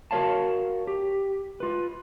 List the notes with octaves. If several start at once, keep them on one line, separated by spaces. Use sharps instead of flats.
F#4 A#4 C#5 F5 A5
G4
F4 B4